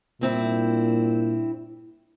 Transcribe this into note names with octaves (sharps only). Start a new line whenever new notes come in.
G2 A#2 C4 E4